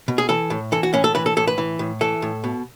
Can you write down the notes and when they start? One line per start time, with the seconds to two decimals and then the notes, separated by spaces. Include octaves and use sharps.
0.08 B2
0.18 G#4
0.29 E3 A4
0.50 A2
0.72 E3 A4
0.83 F#4
0.94 A2 C#4
1.04 A4
1.15 E3 B4
1.26 A4
1.37 A2 A4
1.47 B4
1.58 E3
1.79 A2
2.01 E3 A4
2.22 A2
2.44 B2